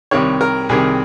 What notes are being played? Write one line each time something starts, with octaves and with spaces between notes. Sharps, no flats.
C2 C3 D#3 C#5
A#4
C2 C3 D#3 G#4